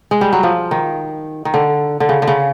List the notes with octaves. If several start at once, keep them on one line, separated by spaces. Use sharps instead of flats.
G#3
G3
F#3
F3
D#3
D#3
D3
D3
C#3
D3
C#3